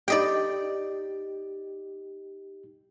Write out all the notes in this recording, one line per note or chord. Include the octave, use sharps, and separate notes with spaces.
D#4 G4 D5 D#5 G5